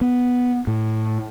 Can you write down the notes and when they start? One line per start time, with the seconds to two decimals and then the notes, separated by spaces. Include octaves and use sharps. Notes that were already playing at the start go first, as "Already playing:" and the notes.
0.01 B3
0.67 A2